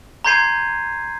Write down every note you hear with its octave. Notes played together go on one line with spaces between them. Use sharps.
A#5 C6 G6 G#6 C7 D#7